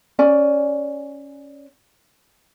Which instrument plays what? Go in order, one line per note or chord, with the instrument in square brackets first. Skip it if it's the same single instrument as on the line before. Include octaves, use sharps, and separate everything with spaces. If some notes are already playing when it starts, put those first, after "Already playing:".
[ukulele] C#4 D5 G#5